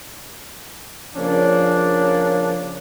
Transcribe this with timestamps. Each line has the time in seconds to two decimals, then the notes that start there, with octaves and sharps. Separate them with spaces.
1.15 C#3 F3 A#3 C#4 D4